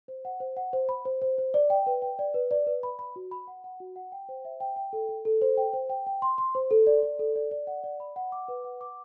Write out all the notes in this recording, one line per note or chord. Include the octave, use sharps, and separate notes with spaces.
C5
F#5
C5
F#5
C5
B5
C5
C5
C5
D5
G5
B4
G5
D5
B4
D5
B4
B5
B5
F#4
B5
F#5
F#5
F#4
F#5
G5
C5
E5
G5
G5
A4
A4
A4
C5
G5
C5
G5
G5
C6
C6
C5
A4
D5
D5
A4
D5
D5
F#5
D5
B5
F#5
D6
B4
F#5
D6